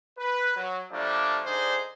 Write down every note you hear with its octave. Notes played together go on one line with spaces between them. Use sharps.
B4
F#3
F3 G3 A3 A#3 D4
D3 D4 D#4 G#4 C5